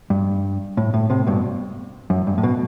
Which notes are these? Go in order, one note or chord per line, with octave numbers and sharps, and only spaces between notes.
G2
A2
A2
A2 C3
G2 B2
F#2
G2
A2
B2